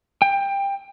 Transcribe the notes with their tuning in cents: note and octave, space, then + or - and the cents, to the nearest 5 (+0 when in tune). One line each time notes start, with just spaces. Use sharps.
G5 +20